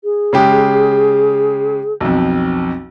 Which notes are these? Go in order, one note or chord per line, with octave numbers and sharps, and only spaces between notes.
G#4
C#3 G#3 G4
B1 F2